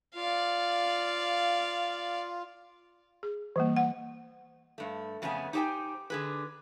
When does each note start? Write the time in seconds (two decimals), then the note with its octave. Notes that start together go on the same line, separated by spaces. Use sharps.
0.15 F4 D5 F5
3.23 G#4
3.56 E3 G3 A#3
3.77 F#5
4.78 G2 A3
5.22 F2 C#3 A3 B3 C#4 G#5
5.53 D#4 G4 C5 D5 G5 G#5
6.10 D3 G#4 B4